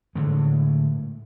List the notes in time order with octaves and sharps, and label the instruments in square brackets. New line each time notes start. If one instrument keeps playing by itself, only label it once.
[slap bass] A2 D3 G#3